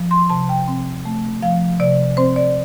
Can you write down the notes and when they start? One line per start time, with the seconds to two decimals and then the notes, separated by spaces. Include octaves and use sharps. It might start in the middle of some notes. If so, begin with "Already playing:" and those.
Already playing: F3
0.11 C6
0.30 C3 A5
0.49 G5
0.68 C4
1.05 A3
1.42 F3 F5
1.80 C3 D5
2.17 C4 C5
2.36 D5